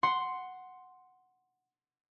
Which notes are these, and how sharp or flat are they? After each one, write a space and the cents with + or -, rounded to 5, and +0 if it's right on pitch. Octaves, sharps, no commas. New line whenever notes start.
F#5 +0 C6 +0